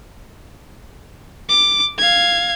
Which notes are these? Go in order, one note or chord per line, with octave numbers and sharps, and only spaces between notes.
D6
F5 G#6